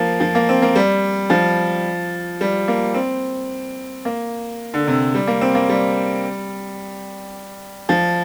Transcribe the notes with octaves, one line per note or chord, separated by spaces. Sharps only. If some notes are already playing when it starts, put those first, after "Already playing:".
Already playing: F3 A#3
F3
A#3
C4
A#3
G3
F3
G3
A#3
C4
A#3
D3
C3
G3
A#3
C4
A#3
G3
F3